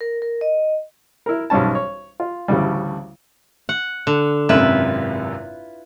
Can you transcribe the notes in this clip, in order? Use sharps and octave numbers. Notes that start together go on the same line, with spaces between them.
A#4
A#4
D#5
E4 A#4
B1 G#2 G3 C#4 A5
C#5
F4
A1 D2 A2 C#3 G3
F#5
D3
G#1 F#2 C3 E4 F4 B4